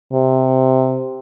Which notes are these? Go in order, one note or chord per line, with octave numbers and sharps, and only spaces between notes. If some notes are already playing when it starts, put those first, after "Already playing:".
C3